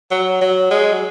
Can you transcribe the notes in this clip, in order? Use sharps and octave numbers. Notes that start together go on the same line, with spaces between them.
F#3
F#3
G#3
F#3